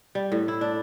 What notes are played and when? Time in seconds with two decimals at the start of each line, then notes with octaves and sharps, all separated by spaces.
0.15 G3
0.32 A2
0.48 E4
0.61 D4